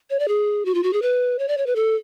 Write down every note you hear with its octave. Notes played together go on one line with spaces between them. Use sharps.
C#5
D5
G#4
F#4
F4
F#4
G#4
B4
C#5
D5
C#5
B4
A4